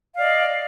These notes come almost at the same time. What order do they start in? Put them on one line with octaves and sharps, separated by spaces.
F5 D5 D#5